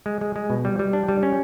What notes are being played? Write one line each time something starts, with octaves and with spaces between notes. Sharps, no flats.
G#3
G#3
G#3
B2
G3
G3
D4
G3
C#4